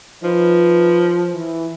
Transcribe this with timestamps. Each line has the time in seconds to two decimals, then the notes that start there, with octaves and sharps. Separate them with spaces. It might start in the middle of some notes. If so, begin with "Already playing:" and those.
0.23 F3 D#4 B4
1.35 E3